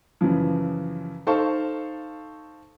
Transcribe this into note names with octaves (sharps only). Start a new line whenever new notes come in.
F#2 C#3 E3 F3
D#4 A4 C5 F5 A5 C#6